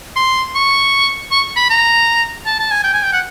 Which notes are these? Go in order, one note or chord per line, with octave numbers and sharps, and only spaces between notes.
C6
C#6
C#6
B5
A#5
A5
A5
G#5
G5
G#5
G5
F#5